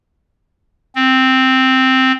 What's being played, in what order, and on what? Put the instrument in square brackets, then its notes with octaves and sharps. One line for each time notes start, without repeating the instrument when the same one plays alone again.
[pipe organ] C4